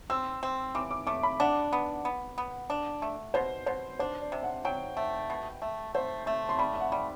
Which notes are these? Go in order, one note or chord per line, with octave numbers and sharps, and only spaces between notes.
C4 E6
C4
E3 D6
D6
A3 D6
B5
D4 F#5
B3
B3
B3
D4
A3
B2 C5
B2 C5
D4 C5
D5
C3
F#5
F#3 G5
A3
B2
A3
A3 C5
A3 A5
C6
G3 B5
E5
F#5
G3